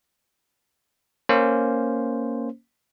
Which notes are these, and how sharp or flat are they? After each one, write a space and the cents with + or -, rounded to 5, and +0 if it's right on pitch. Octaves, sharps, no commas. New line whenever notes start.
A#3 +0 C#4 +0 C5 +0